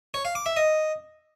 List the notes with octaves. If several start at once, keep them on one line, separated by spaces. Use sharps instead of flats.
C#5
F5
D6
E5
D#5